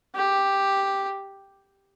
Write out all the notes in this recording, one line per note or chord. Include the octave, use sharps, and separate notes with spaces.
G4